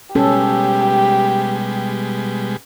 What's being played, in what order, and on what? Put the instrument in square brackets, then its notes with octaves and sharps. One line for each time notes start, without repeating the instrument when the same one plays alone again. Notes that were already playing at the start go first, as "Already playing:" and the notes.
[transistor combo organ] B2 G3 G#3 [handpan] C#4 A4 [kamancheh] G4